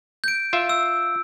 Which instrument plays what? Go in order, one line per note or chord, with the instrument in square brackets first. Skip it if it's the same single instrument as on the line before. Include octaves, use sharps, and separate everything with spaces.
[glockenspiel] G6 D7
[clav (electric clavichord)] F4 E5
[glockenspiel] E6